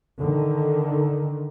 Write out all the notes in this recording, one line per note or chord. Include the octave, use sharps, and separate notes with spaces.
D3 D#3